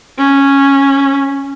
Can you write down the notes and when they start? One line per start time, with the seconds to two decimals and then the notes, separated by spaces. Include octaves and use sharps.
0.18 C#4